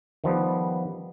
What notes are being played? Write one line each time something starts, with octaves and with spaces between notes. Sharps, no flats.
D#3 F3 G3 B3